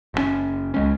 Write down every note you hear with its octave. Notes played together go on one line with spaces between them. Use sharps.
F#1 A#2 C#4
C#2 G#3 C#4